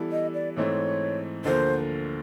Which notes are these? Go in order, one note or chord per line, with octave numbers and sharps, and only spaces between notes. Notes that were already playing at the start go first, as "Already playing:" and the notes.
Already playing: E3 G3 B3 E4 A4
D#5
D5
G#2 E3 A3 C4 C#5
D2 D3 F3 A#3 C5